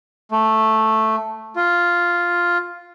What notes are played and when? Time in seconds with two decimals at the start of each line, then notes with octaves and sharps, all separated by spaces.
0.31 A3
1.56 F4